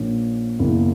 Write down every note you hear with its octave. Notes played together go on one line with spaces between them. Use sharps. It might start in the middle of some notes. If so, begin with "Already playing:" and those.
Already playing: A#1 A#2 A#3 C#4
F#1 E2 B2 A#3 E4